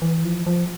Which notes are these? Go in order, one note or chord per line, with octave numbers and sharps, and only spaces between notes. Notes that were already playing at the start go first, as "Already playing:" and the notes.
E3
F3
F3